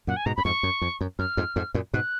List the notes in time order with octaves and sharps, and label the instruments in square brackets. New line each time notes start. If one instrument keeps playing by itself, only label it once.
[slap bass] F#2 A#2 [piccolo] F#5
[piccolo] G#5
[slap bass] G#2 B2 [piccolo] A#5
[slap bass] F#2 [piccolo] B5
[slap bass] F2 G#2 [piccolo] C#6
[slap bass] F#2
F2
F#2
[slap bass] F#2 [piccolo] F6
[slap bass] F2 G#2
F2 G#2
F#2 A#2
[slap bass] G#2 B2 [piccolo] F#6